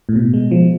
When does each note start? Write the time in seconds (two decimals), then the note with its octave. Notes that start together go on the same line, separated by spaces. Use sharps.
0.09 A2
0.16 B2
0.33 G#3
0.51 F3